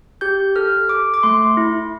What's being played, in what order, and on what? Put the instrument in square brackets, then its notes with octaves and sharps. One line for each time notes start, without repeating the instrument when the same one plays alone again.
[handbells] G4 G6
A4 F6
A4 D6
D6
A3 C6
E4